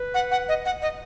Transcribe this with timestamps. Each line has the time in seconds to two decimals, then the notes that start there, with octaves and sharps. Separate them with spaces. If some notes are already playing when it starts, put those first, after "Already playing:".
Already playing: B4
0.14 F#5
0.31 F#5
0.49 D#5
0.65 F#5
0.82 D#5